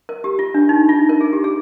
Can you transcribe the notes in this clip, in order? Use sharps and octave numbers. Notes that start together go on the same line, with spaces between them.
A#4
G4
F4
D4
D#4
F4
A#4
G#4
G4
G#4